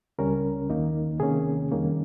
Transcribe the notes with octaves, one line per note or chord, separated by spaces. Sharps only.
C#2 C#3 G3 C#4 A#4
D#2 D#3 A#3 D#4
C3 D#3 A#3 C#4 G#4
F2 D#3 G3 A#3 C#4